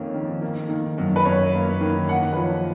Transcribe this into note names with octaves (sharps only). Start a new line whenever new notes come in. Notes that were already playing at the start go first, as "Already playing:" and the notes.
Already playing: F2 D#3 A#3 C#4
D#3
A#3
D#3
F#2
B4
F#2 C#5
A#3
D#3
A#3 F#5
B4
F3 C#5